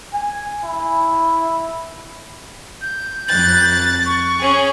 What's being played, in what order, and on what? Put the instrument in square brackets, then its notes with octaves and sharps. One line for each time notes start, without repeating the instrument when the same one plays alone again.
[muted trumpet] G#5
E4
[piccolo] G6
[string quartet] F2 F#6 A6
[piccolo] C#6
[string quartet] C#4 G#4